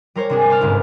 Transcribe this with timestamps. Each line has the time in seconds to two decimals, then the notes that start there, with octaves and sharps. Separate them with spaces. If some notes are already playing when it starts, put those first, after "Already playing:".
0.15 G3 A#4 C5 C#5
0.30 C3 D4 G#4
0.49 C5 A5 F6
0.61 G1 C#2 G#2 C3